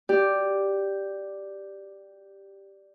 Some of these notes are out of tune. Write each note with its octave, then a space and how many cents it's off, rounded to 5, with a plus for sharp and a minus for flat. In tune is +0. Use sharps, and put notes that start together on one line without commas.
G4 +0 D5 +0